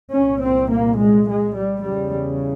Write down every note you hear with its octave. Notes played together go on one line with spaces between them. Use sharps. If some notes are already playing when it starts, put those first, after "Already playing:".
C2 A#2 C#4
C4
A#3
G#3
G#3
G3
E2 C#3 G3